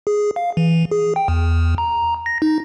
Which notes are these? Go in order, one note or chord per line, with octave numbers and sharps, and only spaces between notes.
G#4
F5
E3
G#4
G5
E2
A#5
A#6
D#4